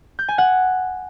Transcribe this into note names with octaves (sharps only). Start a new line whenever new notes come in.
G6
G#5
F#5